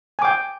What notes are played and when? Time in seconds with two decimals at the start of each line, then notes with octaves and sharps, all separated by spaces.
0.19 G#5
0.22 D6
0.25 G5